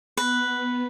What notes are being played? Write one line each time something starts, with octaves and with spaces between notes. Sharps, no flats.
B3 B4